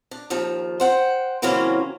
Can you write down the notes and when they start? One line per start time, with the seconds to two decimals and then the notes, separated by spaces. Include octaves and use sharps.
0.11 D4
0.30 D#2 D#3 F3
0.80 C5 F#5 G5
1.42 C#3 E3 F#3 A#3 C4 C#4